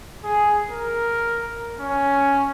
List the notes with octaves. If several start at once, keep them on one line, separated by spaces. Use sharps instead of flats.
G#4
A#4
C#4